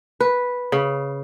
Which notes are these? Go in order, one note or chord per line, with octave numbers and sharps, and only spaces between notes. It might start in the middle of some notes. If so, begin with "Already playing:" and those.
B4
C#3